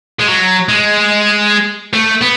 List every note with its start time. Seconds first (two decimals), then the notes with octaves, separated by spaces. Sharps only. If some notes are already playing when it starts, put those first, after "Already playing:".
0.19 G#3
0.27 F#3
0.69 G#3
1.94 A3
2.21 B3